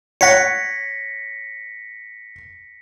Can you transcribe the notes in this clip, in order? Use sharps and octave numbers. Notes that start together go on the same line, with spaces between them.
C#5 F#5 A#6 B6 C#7